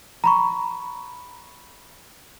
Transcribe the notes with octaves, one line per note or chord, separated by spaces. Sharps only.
A#5 B5 C#6